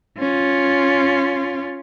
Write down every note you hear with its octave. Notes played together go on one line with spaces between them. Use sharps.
C#4 F4